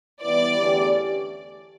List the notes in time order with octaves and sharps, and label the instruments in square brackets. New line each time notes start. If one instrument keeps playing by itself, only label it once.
[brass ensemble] E3 G3 B3 E4 B4 [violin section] D5
[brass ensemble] E2 D3 A3 C#4 G4